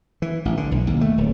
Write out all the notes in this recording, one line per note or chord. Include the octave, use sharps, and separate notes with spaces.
E3
A1
D3
B1
D#2
A3
D1